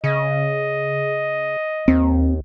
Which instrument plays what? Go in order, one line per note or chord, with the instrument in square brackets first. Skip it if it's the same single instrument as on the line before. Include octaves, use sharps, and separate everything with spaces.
[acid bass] C#3 [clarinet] D#5
[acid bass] D#2 [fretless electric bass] C4